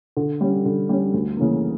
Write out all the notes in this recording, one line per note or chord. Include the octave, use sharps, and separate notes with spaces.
D3
G3 C#4
D3
G3 C#4
D2
C#3 E3 A#3